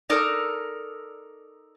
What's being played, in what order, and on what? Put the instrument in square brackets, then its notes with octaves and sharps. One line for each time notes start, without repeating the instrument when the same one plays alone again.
[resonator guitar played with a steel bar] D#4 A4 A#4 D5